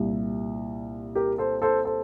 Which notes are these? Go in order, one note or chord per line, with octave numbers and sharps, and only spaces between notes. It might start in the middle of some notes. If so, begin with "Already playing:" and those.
Already playing: C2 A#2 G3
G4 A#4
A4 C5
A4 C5
A4 C5